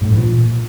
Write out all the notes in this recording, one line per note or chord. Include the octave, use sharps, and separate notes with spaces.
A2
F#2
E3
A#2